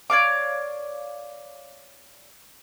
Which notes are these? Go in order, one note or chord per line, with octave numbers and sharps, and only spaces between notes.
C#5 D5 F5 D6